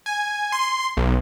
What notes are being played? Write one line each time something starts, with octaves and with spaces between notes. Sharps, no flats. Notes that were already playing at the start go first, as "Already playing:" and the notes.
G#5
C6
B1